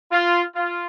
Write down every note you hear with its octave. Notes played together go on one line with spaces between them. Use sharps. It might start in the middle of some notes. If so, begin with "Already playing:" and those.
F4
F4